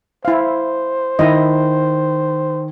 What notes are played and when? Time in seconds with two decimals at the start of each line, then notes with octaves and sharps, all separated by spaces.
0.25 E4 C5 F5
1.19 D#3 E4 D#5